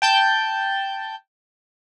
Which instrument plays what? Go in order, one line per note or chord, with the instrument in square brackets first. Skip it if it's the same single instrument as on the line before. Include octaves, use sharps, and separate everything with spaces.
[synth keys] G5 A5 G6